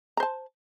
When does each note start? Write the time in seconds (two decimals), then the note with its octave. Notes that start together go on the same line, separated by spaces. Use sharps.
0.17 A#5
0.20 C5
0.23 A5